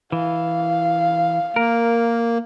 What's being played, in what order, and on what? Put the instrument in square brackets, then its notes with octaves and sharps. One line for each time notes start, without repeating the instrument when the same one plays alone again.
[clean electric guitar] E3 [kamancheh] F5
[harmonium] A#3 [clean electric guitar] A#4